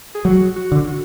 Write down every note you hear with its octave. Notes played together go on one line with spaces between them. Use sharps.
G#4
F#3 F#4
F#4
D3
F#4